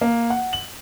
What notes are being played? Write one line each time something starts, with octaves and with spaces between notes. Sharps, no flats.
A#3
F#5
F#7